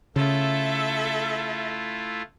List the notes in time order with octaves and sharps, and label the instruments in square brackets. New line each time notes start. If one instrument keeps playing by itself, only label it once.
[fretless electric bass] C#3 [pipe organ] A3 E4 F4 [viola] A4 E5